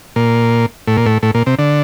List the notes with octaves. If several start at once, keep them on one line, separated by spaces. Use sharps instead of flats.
A#2
A2
A#2
A2
A2
A#2
C3
D3